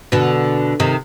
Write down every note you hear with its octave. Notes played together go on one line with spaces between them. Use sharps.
B2 D3
C3 D#3